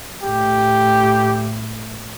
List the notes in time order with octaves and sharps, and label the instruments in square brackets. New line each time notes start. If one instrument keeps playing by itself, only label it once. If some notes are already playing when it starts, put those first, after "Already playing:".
[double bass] A2 [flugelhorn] G4